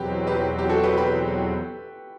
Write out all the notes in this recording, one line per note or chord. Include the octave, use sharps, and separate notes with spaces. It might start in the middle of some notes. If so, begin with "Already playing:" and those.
Already playing: E2 B2 F#3 C4 G4 B4
G4 B4
G4
F#4 A4
G4 B4
G4 B4